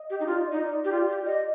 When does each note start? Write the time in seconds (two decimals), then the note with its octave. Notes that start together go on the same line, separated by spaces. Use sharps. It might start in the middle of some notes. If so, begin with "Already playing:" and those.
Already playing: D#5
0.10 G4
0.20 D#4
0.26 F4 D5
0.38 D#5
0.48 D#4 D5
0.85 G4
0.92 F4
1.09 G4
1.26 D#5